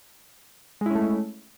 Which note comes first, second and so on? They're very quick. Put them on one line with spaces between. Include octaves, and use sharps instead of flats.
G#3 E4 C#4 A3